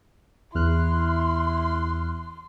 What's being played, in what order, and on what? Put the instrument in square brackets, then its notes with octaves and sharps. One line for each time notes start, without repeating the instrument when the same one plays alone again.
[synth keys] E2 F6 F#6 [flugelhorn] E4 [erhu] C6